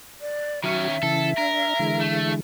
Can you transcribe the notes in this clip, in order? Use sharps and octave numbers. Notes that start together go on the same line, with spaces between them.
D5
D#3 F#3 C#4 F#4 E5
C#3 E3 A4
D4 A#4
D3 E3 G#3
A3